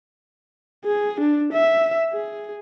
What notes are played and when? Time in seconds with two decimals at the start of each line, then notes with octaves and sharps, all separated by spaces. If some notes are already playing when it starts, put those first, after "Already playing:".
0.85 G#4
1.20 D4
1.53 E5
2.13 G#4